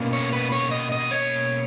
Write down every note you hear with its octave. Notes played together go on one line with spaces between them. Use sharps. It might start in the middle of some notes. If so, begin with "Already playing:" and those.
Already playing: B2 A#3 C#4
C#5
B4
C#5
D#5
D#5
C#5